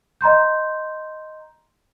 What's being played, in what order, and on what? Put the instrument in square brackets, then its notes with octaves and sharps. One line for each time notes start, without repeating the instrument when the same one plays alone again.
[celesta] D#5 A#5 C6 G6